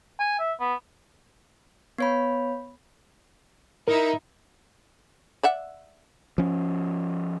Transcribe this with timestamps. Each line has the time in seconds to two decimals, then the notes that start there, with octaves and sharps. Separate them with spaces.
0.20 G#5
0.39 E5
0.60 B3
1.98 B3 C#5 B5
3.88 D#4 E4 A#4 E5
5.43 D5 E5 F#5
6.38 F3 C#4